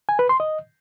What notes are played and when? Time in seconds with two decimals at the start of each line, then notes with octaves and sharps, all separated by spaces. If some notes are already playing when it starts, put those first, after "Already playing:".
0.09 G#5
0.19 B4
0.29 C6
0.40 D#5